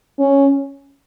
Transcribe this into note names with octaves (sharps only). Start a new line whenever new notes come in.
C#4